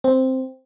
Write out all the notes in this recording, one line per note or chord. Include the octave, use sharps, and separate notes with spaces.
C4